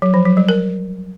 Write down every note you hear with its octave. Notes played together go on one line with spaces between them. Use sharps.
F#3
F3
F#3
G3
A#4